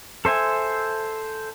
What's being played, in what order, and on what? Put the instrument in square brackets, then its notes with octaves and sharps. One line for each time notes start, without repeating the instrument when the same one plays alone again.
[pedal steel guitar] A4 C5 E5 G#5